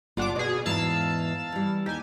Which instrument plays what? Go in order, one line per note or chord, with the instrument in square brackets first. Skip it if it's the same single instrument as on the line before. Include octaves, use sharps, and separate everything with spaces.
[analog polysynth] G1 D4 D6 [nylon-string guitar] F4 D5 F#5
[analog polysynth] B2 G#4 [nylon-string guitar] D5
[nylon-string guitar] E2 G#2 E3 [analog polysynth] F5 A5 E6
[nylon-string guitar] E3 G3
[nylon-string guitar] D#2 [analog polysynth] G4 G#5